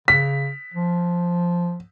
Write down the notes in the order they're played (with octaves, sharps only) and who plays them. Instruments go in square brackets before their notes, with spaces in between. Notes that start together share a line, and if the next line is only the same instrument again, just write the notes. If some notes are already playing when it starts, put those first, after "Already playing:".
[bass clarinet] C#3 [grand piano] B6
[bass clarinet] F3